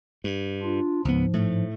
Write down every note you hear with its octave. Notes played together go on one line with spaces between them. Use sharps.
G2
D4 F4
C#2 G#2 F3 B3
A2 A3